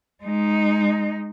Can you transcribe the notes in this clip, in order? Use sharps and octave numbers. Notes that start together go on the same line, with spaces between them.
G#3 D#4